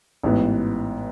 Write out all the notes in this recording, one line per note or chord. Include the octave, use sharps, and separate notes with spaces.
A1 G#2 E3 B3